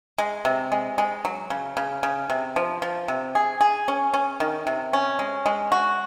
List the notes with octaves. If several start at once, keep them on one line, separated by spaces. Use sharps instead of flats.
G#3
C3
G#3
G#3
F#3
C#3
C#3
C#3
C3
F3
F3
C3
G#4
G#4
C#4
C#4
D#3
C3
C#4
G#3
G#3
F#4